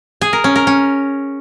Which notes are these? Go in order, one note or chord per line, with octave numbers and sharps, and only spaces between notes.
G#4
A#4
C#4
A#4
C#4